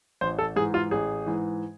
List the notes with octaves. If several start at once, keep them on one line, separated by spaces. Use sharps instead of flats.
A1 C5
A4
G#2 E3 G#4
F4
A1 G#4
G#2 E3